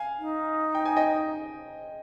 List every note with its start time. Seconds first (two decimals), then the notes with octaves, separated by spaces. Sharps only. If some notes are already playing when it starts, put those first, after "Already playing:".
Already playing: F5 G#5
0.19 D#4
0.75 G5
0.85 G#5
0.96 D#5 G5